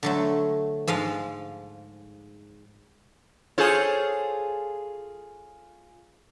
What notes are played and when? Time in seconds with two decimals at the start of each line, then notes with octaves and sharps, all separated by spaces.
0.03 D3 F#3 A3
0.87 G#2 F3 G#3 F5
3.58 F4 G#4 A4 C5 C#5